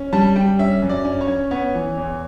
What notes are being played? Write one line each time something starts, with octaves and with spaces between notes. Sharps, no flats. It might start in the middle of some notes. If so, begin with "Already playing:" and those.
Already playing: C#4
G3 A5
G3 G5
C#4 E5
F#2
D5
C#4
C#5
C#4
B3 C#5
E3
E2